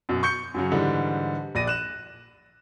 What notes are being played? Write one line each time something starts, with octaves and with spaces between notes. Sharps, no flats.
F#2 B2
C#6 G6 C#7
F#2 C#3 F#3
G#2 D3 E3 G3
A#1 D5 A#6 D#7
F#6 E7